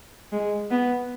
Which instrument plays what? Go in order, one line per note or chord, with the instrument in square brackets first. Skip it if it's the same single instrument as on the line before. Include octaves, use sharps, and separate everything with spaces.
[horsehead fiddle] G#3
B3